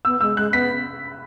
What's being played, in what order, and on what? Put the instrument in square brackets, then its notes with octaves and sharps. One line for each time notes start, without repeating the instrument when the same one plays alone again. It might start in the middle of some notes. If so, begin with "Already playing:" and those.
[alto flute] B3 [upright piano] E6
[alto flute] G#3 [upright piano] E6
[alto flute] G#3 [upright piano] F#6
[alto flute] B3 [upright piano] B6